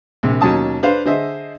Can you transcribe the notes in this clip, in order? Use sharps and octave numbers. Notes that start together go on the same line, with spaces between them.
A#1 C3
D#2 B2 F#3 C#4 A5 D#6
D4 B4 C5 F5
D3 G#4 C5 D#5 E5